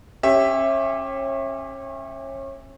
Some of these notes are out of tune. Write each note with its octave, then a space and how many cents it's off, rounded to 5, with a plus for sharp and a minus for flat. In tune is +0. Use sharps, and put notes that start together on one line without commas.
C#4 -30 G4 +0 E5 +0